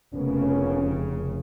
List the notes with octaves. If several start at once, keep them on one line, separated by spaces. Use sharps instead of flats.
F1 C#3 A#3 B3 C#4